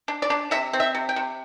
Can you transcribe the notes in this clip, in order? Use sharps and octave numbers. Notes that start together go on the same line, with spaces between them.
D4
D5
D4
C3 E5
C4
E5
C3
G5
C3